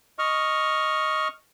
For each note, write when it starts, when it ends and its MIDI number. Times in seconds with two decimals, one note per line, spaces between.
0.19 1.28 75
0.19 1.28 85
0.19 1.28 89